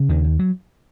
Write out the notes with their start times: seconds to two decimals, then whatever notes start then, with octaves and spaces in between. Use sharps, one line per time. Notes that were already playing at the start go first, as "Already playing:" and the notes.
Already playing: C#3
0.09 D#2 D#3
0.24 D#2
0.39 F#3